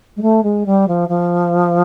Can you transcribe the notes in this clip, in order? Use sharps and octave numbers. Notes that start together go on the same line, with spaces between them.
G#3
A3
G#3
G3
F3
F3